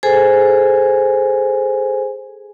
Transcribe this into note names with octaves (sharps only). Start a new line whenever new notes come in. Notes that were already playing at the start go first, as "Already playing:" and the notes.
G#4 A4 C5 G#5